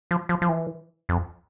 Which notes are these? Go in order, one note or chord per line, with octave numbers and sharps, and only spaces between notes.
F3
F3
F3
E3
F2